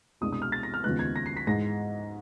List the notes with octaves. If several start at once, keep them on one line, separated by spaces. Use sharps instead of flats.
C2 B2 G#3 B3 D4 D#6
D#6
F6
A6
A#6
F6
D#2 C#3 F3 G#3 B3 F#6
G#6
A#6
C7
B6
G#2 E3 G#3 A#6